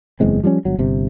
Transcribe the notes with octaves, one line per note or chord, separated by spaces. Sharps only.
F#1 E2 G#3 C4
F3 G3 B3 C#4
G1 F#3
G1 C3